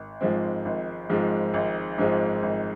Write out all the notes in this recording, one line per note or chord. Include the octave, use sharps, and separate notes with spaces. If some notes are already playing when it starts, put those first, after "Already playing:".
Already playing: G#1
G#2 F3 G#3 C4
G#1
G#2 F3 G#3 C4
G#1
G#2 F3 G#3 C4
G#1